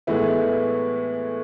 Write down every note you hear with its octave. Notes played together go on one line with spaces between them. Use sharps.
A2 E3 G#3 B3 E4